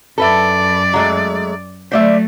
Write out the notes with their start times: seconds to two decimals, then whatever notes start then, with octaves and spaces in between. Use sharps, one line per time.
0.18 F#2 A4 B4 D5 E5
0.94 F#3 G#3 A3
1.92 F#3 A3 C5 D5 E5